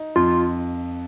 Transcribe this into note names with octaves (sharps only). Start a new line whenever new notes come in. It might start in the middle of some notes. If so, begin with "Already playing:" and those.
Already playing: D#4
F2 F4